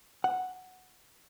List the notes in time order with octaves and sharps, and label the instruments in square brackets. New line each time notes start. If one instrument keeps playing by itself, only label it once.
[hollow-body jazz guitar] F#5